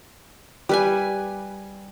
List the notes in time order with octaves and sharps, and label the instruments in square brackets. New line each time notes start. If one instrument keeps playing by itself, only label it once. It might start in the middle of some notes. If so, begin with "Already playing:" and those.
[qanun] G3 B4 G#5